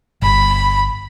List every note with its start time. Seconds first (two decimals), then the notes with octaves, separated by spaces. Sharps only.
0.22 G1 B5